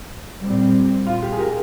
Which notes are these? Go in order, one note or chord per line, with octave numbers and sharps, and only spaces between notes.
A#2 G3 C4
F4
G4
G#4
G4 A#4